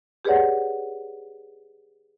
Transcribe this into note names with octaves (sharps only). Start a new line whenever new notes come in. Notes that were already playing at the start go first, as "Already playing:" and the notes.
G4 G#4 B4 C#5 D5 F#5